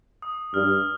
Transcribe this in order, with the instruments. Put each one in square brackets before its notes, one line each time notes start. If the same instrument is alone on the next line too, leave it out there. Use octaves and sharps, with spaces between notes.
[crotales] D#6
[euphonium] G2 [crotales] F6